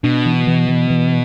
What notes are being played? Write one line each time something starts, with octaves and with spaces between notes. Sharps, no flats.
B2 D4
E3
E3
E3
E3